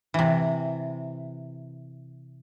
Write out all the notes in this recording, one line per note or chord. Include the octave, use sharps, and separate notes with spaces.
C3 E3